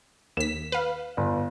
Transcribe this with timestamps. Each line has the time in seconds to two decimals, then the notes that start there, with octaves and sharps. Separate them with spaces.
0.37 D#2 B6 E7
0.72 B4 F5
1.17 G1